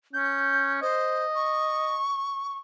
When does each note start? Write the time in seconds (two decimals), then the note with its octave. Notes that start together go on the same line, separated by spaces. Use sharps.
0.14 C#4 G6
0.82 C5 D#5
1.35 C#6